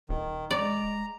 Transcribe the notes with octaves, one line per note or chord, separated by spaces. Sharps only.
D#1 D#3
G#3 D5 A#5